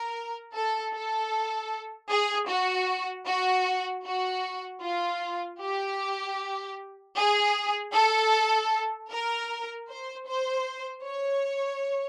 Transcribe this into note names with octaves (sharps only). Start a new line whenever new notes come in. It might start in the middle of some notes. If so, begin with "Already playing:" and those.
Already playing: A#4
A4
A4
G#4
F#4
F#4
F#4
F4
G4
G#4
A4
A#4
C5
C5
C#5